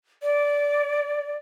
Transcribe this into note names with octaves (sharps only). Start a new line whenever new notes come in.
D5